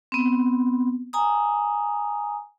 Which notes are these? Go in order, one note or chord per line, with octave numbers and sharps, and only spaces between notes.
B3 C4
G#5 A#5 D#6